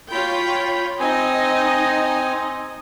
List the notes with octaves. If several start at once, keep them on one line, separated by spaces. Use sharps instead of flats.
F4 C#5 G5 B5
C4 D#4 D#5 G#5